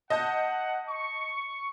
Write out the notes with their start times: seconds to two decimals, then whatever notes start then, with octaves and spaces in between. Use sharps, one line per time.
0.10 D#5 F#5 A5 G6
0.89 C#6